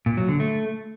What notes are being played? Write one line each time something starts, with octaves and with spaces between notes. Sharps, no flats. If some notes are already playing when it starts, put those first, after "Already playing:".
A#2
F#3
D3
A3